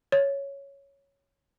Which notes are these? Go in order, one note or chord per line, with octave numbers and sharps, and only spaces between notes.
C#5